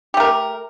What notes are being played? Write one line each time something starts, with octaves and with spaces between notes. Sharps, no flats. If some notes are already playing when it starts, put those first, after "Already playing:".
A3 G4 A#4